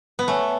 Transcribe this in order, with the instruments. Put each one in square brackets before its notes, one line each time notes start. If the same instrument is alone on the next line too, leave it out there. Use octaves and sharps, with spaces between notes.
[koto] B3
[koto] A3 [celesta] C#5 G#5 C#6